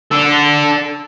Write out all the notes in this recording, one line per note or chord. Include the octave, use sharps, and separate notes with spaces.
D4 A4